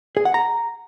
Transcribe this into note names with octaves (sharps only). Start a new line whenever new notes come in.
G#4
F#5
A#5